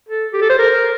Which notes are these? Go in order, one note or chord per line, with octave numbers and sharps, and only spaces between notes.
A4
G4
A4
C5
A#4